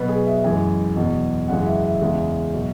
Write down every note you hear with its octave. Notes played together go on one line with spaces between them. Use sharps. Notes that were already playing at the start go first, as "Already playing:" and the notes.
Already playing: B2 F#3 B4
G#4
E5
F#2 E3 G#3 G#5
E2 B2 F#3
F#2 C#3 E3 G#3 F#5
E5
E5
E2 C#3 G#3
B2 F#3